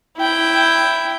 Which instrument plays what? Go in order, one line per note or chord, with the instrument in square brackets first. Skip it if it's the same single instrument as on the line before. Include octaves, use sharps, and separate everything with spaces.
[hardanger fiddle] E4 G5